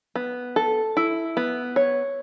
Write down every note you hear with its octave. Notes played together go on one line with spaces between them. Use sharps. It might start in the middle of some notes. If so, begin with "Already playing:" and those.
B3
A4
E4
B3
C#5